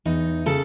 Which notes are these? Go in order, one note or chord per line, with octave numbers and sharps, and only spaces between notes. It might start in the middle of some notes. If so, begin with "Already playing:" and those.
E2 D#4
C#3 A4